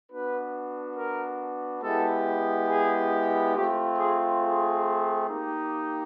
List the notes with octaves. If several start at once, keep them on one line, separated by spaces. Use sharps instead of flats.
B3 D4 F#4 B4
A#4
G#3 B3 E4 G4 A4
G#4
A3 C4 F4 G4
G#4
G#4
A#3 D#4 G4